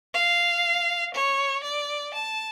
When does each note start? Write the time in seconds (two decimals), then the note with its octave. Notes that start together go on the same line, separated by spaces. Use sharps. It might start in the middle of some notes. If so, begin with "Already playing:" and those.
0.14 F5
1.14 C#5
1.63 D5
2.14 A5